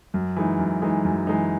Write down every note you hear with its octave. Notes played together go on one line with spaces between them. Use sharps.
F#2
E3 G#3 D#4
F#2
E3 G#3 D#4
F#2
E3 G#3 D#4